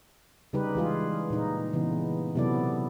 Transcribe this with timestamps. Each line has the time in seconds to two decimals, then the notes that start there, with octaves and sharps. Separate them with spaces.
0.53 C#3 G3 D#4 G4 B4
0.75 E3 G#3 F4 G#4
1.30 A#2 D#4
1.73 C#3 E3 B3
2.35 C3 F#3 B3 E4 A4 D5